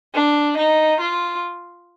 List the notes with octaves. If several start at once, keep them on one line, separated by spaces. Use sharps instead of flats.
D4
D#4
F4